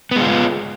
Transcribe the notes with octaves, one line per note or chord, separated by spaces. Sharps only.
G#3 B3 F4